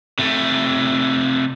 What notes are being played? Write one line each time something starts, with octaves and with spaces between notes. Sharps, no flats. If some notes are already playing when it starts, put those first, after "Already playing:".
C3 A3